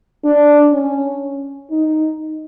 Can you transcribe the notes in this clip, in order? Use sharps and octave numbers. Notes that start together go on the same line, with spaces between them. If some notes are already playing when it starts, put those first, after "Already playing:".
D4
C#4
D#4